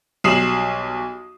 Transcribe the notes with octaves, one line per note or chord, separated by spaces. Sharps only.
B1 G3 D#6 C7 E7 F#7